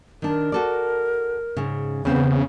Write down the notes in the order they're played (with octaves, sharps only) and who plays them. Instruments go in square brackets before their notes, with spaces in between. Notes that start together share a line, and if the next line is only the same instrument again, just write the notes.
[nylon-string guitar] D#3 D4 [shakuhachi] A#4
[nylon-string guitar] F#4 A4 D5
G#2 C#3
[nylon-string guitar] E2 C4 [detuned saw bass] C#3 [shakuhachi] B3